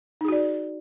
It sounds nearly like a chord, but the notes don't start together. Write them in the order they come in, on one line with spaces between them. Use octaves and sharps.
D#4 G#4 F#4 D5